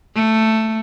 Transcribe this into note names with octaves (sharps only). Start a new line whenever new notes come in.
A3